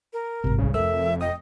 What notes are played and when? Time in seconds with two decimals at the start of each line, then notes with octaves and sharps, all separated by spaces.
0.13 A#4
0.44 G#1 F#2 C3
0.58 C2 C#3
0.74 F1 F2 A4 A#4 E5 E6
1.21 D#5 G5 D#6